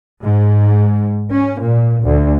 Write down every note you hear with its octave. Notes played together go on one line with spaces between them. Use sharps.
G#2
C#4
A#2
D2